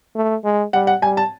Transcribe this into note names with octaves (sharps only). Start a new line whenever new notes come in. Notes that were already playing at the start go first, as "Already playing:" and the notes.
A3
G#3
G3 F#5
F#5
G3 G#5
A5